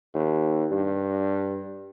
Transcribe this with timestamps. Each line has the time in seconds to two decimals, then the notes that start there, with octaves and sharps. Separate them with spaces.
0.14 D#2
0.72 G2